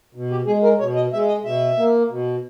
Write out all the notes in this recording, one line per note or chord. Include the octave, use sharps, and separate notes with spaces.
B2
G4
G#3 G#4
A#4
B2 C#5
D#5
G#3 E5
D#5
B2 E5
A#3
B2